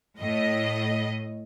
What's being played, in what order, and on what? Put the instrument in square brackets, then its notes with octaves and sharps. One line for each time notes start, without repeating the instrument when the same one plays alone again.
[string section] A2 D#5